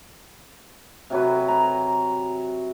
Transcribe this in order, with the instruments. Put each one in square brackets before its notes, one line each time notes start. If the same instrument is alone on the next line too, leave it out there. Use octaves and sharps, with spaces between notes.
[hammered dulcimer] C3 F#3 B4
A#5